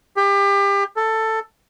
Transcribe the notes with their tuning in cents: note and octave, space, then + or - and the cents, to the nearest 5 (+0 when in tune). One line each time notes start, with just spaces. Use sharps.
G4 +30
A4 +10